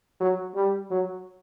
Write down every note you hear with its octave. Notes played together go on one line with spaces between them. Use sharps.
F#3
G3
F#3